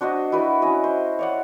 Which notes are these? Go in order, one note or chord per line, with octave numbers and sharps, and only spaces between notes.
D4 F#4 C5 D#5
E4 F#4 B4 D5
C#4 E4 D#5
C5
C#5 D5 F#5